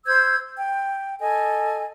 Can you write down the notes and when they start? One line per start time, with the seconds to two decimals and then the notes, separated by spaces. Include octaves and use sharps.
0.06 C5 E6 G6 G#6
0.56 G5
1.20 A4 D#5 G#5